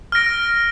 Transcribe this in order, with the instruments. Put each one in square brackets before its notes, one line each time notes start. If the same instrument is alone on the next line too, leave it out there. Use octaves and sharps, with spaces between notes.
[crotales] F6 A#6 D7